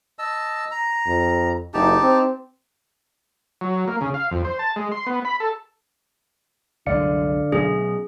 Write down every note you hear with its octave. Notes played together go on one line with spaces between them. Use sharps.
D#5 A5 E6
A#5
F2
F#1 D#4 G4 A5
C4
F#3
A#3
C#3
F5
F2
C5
A5
G#3
C6
B3
B5
A4
C2 F#2 D3 G#3 D5 F5 C#7
B2 F#3 C#4 G#4